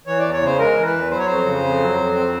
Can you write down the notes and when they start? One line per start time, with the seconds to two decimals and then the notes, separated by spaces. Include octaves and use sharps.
0.07 E3 C#5
0.19 E2 D5
0.33 C#5
0.42 C#3 C5
0.59 G#3 A#4
0.77 E3
0.85 B4
0.94 E2
1.11 F#3 C5
1.19 C#5
1.26 F2 C5
1.45 C#3
1.64 F2
1.80 F#3
1.98 F2
2.16 C4